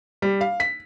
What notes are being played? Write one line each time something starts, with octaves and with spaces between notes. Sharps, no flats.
G3
F5
B6